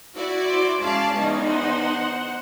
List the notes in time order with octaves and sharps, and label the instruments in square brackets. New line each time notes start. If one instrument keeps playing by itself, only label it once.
[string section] E4 F#4 D5
[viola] C5 D6
[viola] G#3 C#4 [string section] D5 F5 A5
[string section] E2 D#4
[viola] C5 F#5